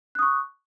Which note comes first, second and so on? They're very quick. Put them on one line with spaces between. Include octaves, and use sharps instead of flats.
F#6 D#6 C#6